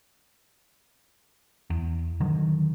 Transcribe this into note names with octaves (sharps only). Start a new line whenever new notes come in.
E2
D3 D#3 F#3